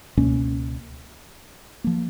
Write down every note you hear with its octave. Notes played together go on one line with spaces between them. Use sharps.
C#2 B2 A#3 C#4
F3 A#3